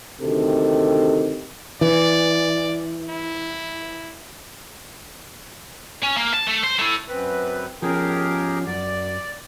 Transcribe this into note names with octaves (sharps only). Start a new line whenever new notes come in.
D2 C3 D#3 A4
E3 D5
E4
C#4
A#3
A5
A3
C5
A3 E4
F#2 C4 B4
F3 C#4 G4 G#4 A#4
F#2 D5